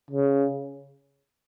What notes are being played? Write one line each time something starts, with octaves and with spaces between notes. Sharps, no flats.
C#3